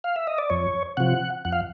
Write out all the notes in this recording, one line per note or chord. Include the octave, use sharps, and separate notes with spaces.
F5
E5
D#5
D5
F2 C#5
C3 F3 F#5
F2 F#5
F5